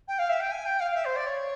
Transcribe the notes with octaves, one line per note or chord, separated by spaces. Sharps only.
G5
F5
E5
G5
G#5
G5
F5
E5
C5
D5
C#5